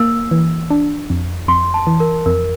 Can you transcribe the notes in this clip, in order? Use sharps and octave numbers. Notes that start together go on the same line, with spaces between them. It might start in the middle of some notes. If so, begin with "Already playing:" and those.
Already playing: A#3 E6
E3
D4
F2
F2 C6
A5
E3
A#4
F2 A#4